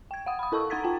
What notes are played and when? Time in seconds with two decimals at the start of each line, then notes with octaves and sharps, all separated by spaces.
0.11 G5 G#6
0.26 F5 F#5 D#6
0.39 B5 D#6
0.52 E4 A4 A5 C#6 E6
0.70 D#4 F#5 A#5 G#6 A6 B6
0.84 F4 G5 A5